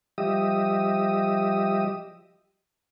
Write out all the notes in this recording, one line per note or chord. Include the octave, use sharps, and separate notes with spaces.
F3 G3 G4 D#5 E5 D#6